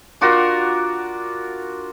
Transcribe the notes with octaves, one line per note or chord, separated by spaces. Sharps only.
D4 F4 F#4 A#4